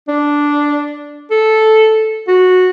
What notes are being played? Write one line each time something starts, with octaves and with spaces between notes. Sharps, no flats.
D4
A4
F#4